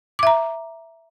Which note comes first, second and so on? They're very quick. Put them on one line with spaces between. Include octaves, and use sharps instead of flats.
D6 E5 A#5